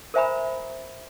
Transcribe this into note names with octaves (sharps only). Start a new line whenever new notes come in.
A#4 C5 E5 G#5 A#5 B5